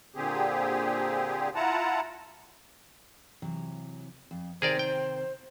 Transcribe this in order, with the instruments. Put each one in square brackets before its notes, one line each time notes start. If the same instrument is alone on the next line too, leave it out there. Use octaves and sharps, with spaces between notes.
[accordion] A#2 D3 C4 G4 G#4
E4 F4 F#5 A5 A#5
[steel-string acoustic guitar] C3 E3 F#3
F2
[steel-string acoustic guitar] C3 D#3 [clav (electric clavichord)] G#4 A#4 D5 [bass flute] C5
[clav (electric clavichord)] G5